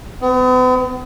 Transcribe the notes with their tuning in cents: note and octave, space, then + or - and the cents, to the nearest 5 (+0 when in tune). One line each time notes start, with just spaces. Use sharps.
B3 +45